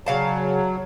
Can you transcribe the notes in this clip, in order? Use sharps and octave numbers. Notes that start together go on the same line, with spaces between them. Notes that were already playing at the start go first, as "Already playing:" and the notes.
C#3 F#3 F5 A5